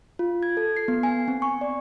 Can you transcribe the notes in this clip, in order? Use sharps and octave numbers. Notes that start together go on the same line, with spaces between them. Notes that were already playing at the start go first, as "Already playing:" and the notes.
F4
G#6
A4
C7
B3
G#5
C4
C#6
D5